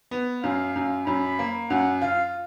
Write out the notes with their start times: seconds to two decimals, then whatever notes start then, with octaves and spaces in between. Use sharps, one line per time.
0.11 B3
0.43 F#2 F5
0.76 F#2
1.06 F#2 B5
1.39 A#3
1.70 F#2 F#5
2.02 F4 F5